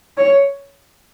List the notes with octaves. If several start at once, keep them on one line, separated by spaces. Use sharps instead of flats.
C#5